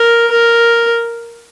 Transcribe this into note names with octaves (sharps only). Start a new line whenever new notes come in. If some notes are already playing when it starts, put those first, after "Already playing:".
Already playing: A#4
A#4